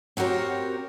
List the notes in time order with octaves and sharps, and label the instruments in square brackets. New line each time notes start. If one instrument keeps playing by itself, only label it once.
[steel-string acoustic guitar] C4 F#4 G4 A#4 C#5